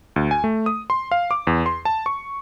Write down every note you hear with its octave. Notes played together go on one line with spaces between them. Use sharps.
D2
G#5
A3
D#6
C6
F5
D6
E2
C6
A5
C#6